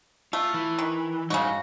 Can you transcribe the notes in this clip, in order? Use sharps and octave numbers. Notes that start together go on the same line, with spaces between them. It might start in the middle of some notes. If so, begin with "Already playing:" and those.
A3 F4
E3
D#3
G2 C#3 D#4 F#4